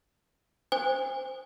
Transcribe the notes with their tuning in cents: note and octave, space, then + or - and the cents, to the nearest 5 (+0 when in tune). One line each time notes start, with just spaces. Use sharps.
C5 -5 G#5 -45